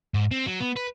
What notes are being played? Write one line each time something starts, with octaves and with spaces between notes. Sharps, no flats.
G#2
C4
F#3
B3
B4